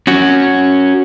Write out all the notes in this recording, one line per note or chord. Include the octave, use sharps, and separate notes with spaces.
C#4 F#4